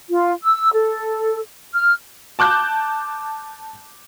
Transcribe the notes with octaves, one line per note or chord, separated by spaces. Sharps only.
F4
E6
A4
F6
A5 D6 F#6 G6